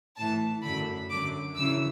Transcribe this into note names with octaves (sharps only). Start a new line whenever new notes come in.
A2 E3 A5
F#2 D3 B5
F#2 D3 D6
F#2 C#3 E3 E6